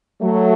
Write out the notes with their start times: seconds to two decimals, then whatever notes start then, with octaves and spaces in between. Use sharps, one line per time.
0.22 F#3 A3